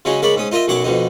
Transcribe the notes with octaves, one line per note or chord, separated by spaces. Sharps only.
C#3 F#3 G#3 C#4 D#4
C#3 G#3 A#4 D5 B5 C#6
G#2 C#4 D#6
D#4 F4 A#4 D#5 E5
B1 F#2 F#3 F#5 C#6 D6
F2 B2 D3 D#4